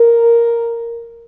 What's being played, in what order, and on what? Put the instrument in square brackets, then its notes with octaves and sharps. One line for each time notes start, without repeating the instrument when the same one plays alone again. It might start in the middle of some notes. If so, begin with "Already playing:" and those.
Already playing: [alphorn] A#4